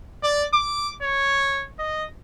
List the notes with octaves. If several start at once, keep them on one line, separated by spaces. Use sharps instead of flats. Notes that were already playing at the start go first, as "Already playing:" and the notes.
D5
D6
C#5
D#5